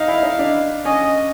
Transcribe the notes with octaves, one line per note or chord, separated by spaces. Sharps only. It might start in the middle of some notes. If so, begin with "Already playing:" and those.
Already playing: D#4 F5
E4
D#4
D4
C#4 D#5